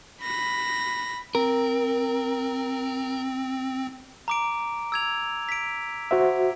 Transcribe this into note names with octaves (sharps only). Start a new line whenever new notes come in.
B5 A#6
C4 A#4
A#5 D6 D7
E6 G#6 F7
B6 D7
F#4 C5 E5